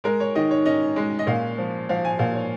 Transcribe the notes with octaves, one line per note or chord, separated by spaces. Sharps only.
G#3 A#4
C#5
D#3 D#5
C#5
C#4 D#5
G#3
D#5
A#2 F5
F3
F3 F5
G#5
A#2 F5
C#5